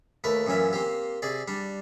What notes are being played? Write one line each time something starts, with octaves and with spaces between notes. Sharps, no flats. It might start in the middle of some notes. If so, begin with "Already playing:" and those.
D#2 A3 A#4 B4
F#2 A#2 E3 C#4 E5
A#3 C4 G4
C3 G#4 D5
G3 D4